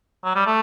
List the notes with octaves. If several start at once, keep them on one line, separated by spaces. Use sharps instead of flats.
F#3
G3
A3